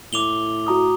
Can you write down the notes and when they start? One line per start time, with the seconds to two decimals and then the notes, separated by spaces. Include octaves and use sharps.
0.13 A2 D6 F7 G7
0.67 F#4 A#5 D#6